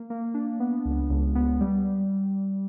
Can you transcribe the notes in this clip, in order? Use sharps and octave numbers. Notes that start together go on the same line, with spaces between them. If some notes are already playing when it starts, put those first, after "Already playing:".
Already playing: A#3
A#3
D4
B3
C#2
C#2
B3
G3